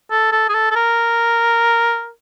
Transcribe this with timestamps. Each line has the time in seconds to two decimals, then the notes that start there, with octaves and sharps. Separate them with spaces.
0.11 A4
0.32 A4
0.49 G#4
0.54 A4
0.71 A4
0.76 A#4